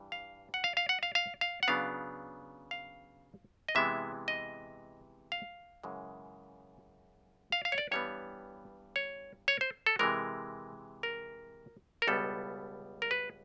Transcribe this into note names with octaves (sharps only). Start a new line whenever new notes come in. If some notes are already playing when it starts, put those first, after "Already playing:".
Already playing: G2 E3 G3
F5
F#5
F5
F5
F#5
F5
F5
F5
F#5
C#3 F#3 B3 D4 F5
F5
D#5
C3 E3 G#3 B3 E4 E5
D#5
F5
F#2 C#3 E3 G#3
F5
F5
C#5
D5
G2 E3 G3 B3 C#5
C#5
C#5
C5
A4
C3 E3 G#3 A#4
A#4
A#4
C#2 B2 G3 B3 A4
A#4
B4